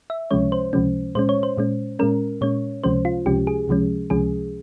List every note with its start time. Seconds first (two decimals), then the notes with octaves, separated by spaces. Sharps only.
0.10 E5
0.31 C#2 C3 F3 G#3 C#4 C#5
0.52 C5
0.73 C#2 C3 F3 G#3 C#4
1.15 A#2 G#3 C#4 C5
1.29 C#5
1.43 C5
1.57 A#2 G#3 C#4
1.99 A#2 G#3 C#4 A#4
2.41 A#2 G#3 C#4 C#5
2.84 C#2 C3 F3 G#3 C#4 C5
3.05 F4
3.26 C#2 C3 F3 G#3 C#4 G4
3.47 G#4
3.68 C#2 C3 F3 G#3 C#4
4.10 C#2 C3 F3 G#3 C#4 G#4